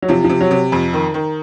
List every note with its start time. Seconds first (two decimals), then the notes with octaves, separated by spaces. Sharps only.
0.02 F#3
0.08 C3 F3
0.24 C3 F3
0.41 F#3
0.51 C3
0.72 F2
0.93 D#3
1.14 D#3